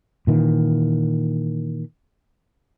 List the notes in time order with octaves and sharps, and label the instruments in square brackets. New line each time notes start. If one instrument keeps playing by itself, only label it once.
[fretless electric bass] A#2 D#3 E3